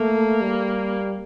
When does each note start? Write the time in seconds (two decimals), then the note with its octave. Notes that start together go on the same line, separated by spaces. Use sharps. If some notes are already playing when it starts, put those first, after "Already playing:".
Already playing: A3 A#3
0.41 G3